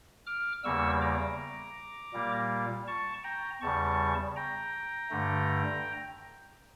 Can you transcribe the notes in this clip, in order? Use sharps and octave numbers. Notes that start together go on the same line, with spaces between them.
D6 F6
E2 C#3 G3 A#3 C#6 E6
A#5 D6
A#2 G3 A#3
A5 C#6
G5 A#5
E2 C#3 G3 A5 C#6
G5 A#5
G2 D3 A3